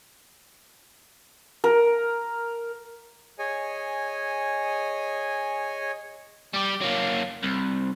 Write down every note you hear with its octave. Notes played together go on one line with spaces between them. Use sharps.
A#4
G#4 C#5 D#5 G#5
G3 G4
F#3 A#3
C2